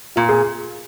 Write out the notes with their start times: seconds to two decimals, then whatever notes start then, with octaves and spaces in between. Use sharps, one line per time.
0.16 A#2 F4
0.29 G#4